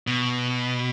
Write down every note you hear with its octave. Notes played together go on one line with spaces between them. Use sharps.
B2